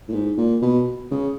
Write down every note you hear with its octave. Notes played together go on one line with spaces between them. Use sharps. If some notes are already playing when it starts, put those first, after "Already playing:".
A2
G#2
A#2
B2
C#3